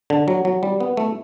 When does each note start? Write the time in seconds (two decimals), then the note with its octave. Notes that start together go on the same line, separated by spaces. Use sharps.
0.10 D3
0.28 F#3
0.45 F#3
0.63 G3
0.80 B3
0.97 A3